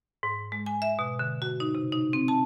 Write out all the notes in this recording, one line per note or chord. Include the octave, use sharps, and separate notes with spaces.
G#2
G#3
G#5
E5
B2
D3
F#4
D#4
C3
D#4
C4
A5